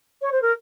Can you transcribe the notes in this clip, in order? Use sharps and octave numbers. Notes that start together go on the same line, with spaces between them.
C#5
C5
A#4